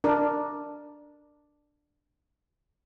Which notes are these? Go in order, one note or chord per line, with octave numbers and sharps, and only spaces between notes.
D4 A#4